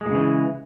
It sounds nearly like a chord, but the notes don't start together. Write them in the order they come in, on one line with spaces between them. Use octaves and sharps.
G#3 A#2 C#3 E3